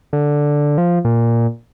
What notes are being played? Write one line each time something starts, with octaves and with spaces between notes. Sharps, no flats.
D3
F3
A#2